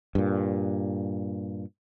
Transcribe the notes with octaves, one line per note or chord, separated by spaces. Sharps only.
G2 A#2